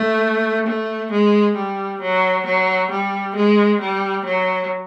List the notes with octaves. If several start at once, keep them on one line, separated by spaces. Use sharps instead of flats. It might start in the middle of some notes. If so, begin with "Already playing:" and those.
Already playing: A3
A3
G#3
G3
F#3
F#3
G3
G#3
G3
F#3